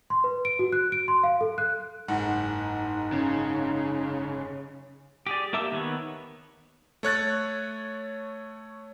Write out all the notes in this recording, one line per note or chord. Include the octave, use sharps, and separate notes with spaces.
C6
B4
D7
F#4
F#6
D7
C6
F5
A4
F#6
F#1 G#2 D#4 F#5
C#3
G4 G#4 D5
A#3 G4 E5 A5 E6
D#3 B3 B4 C#5
A3 C#5 F#6 A6